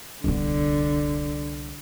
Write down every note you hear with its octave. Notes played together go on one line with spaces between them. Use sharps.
D1 C2 D3 B3